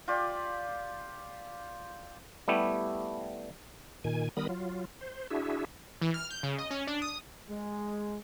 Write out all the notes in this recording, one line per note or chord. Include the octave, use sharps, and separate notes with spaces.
F4 G4 D5
G3 A3 B3 E4 G4
A#2 D#3 G#5
D#3 G3 B3 A#4 B5 D#6
F#3 F4
C5
D4 E4 F#4 G#4 E5
E3
F6
G6
C#3
D#5
C#4
D4
D#6
G#3